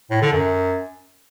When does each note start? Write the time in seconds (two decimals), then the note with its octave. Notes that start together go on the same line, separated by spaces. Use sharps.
0.10 A2
0.22 D3
0.33 F#2